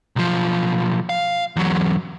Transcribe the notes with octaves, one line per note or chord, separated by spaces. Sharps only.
B1 F3
F5
E2 F#3